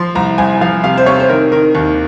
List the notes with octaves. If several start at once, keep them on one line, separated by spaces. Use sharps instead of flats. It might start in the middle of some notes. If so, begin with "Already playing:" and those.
Already playing: F3 C6
C2 A#5
C2 G#5
F3 F5
C3 F5
C5
C3 C#5
C5
D#3 A#4
D#3 A#4
D#2